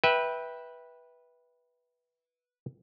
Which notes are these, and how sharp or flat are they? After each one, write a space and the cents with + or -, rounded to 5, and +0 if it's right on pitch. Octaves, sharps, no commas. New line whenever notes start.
B4 -15 E5 -10 G5 +0